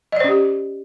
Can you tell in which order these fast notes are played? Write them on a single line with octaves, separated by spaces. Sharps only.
D#5 D5 C5 C#4 G4